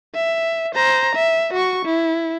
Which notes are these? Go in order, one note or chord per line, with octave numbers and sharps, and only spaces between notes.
E5
C5 A#5
E5
F#4 C#6
E4